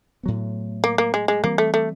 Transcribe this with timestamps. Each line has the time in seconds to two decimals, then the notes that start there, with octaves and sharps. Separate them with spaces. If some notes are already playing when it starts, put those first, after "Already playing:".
0.23 A2 F#3 B3
0.84 A#3
0.98 A#3
1.14 G#3
1.28 G#3
1.44 E3 G3 A#3 C4
1.58 A3
1.74 A3